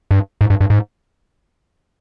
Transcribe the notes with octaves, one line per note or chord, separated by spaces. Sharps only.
G2
G#2
G2
G2
G#2